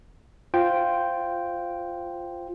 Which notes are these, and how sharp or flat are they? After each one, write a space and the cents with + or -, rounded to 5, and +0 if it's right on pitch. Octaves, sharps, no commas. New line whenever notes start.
F4 +0 C5 +0 G5 +0